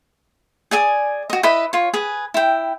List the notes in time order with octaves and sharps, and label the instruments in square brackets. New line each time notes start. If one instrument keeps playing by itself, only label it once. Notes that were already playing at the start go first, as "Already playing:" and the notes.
[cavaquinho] G#4 D5 G#5 D#6
F#4 D#5
E4 B4 D#5 B5
F4 C#5
G#4 B4
E4 G5